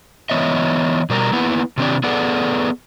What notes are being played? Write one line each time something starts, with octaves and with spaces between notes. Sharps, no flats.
E3 B3 C#5 D#5 E5
B2 G3 A#4 C5 A#5
A#3 B3 E4 B4 F#5
C3 D#3 C4 D4 G4 D5
B3 G#4 A4 B4 D5 F#5